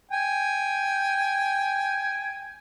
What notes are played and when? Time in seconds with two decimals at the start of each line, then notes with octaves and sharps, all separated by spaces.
0.11 G5 G#5